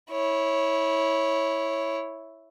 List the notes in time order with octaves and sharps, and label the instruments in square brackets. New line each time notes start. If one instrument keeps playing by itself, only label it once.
[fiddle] E4 C#5